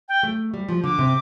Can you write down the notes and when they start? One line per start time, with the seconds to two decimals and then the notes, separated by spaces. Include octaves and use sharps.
0.09 G5
0.23 A3
0.54 G3
0.69 F3
0.84 D3 D6
0.99 C3